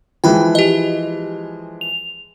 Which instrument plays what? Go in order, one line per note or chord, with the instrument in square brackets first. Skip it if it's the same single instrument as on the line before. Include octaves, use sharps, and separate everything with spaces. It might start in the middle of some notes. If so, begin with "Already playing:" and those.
[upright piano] E3 F3 G#3 [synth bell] G5 B5
[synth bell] G4 D#5
F7